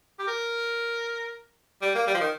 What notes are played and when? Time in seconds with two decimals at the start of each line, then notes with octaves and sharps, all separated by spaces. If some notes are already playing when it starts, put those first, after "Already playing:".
0.19 G4
0.27 A#4
1.82 G3
1.95 A#3
2.07 G3
2.15 F3
2.20 D#3